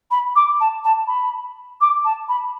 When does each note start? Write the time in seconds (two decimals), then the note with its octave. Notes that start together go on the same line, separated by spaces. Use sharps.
0.11 B5
0.35 D6
0.60 A5
0.84 A5
1.07 B5
1.80 D6
2.04 A5
2.28 B5